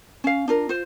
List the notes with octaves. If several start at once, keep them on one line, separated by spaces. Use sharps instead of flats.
C#4 F5
D4 F4 A#4
F4 C5